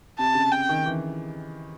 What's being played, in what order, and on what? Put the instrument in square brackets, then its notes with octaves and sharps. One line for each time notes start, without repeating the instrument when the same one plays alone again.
[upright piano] C3 [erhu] A5
[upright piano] C#3
[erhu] G5
[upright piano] D#3
E3